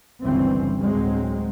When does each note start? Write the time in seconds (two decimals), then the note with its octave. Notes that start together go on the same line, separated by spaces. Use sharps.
0.23 G1 C#2 G2 E3 C4 C#4
0.81 D2 A2 F#3 G#3 C4